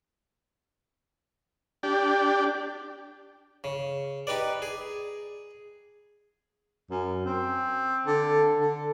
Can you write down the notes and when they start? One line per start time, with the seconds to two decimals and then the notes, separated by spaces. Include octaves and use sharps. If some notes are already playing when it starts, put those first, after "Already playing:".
1.83 D4 G4
3.64 C#3
4.27 D#4 G4 B4 D5
4.62 G#4
6.91 F#2
7.26 C4
8.06 D3
8.60 D3